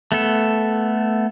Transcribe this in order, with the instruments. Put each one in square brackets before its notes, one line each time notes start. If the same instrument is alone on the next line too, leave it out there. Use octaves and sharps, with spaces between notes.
[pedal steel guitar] A3 B3 A4